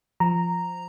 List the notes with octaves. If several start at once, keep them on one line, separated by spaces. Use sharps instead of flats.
F3 A#5